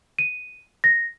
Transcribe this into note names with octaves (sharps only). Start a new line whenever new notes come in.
D#7
A#6